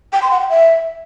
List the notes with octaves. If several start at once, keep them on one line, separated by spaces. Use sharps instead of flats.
G5
C6
F#5
G5
E5